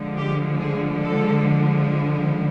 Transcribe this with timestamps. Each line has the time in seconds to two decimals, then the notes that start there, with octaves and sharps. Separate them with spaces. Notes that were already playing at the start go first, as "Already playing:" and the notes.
Already playing: D3 F3 G#3
0.17 G4
0.60 G#4
1.03 A4